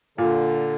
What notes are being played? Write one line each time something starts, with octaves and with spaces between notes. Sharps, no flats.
A#2 D3